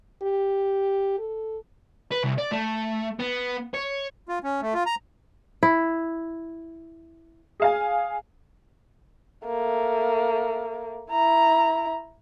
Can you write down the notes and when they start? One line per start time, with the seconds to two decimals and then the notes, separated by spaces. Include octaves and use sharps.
0.22 G4
1.19 A4
2.12 B4
2.24 C2
2.38 D5
2.52 A3
3.19 B3
3.74 C#5
4.29 F4
4.44 C#4
4.62 A3
4.74 F4
4.86 A#5
5.63 E4
7.60 G#4 F5 G#5
9.45 A3 A#3
11.12 E4 A#5